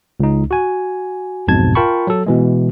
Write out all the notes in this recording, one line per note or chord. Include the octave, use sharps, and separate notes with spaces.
C#2 D#4
F#4 G#5
B1 F2 G#2 B2 A5 G#6
F4 A#4 G5 A5 B5 C#6
F#3 A4
B2 E3 G#3